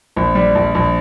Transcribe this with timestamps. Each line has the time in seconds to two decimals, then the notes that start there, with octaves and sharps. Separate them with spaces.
0.16 A#1
0.35 G3
0.55 A#1
0.75 A#1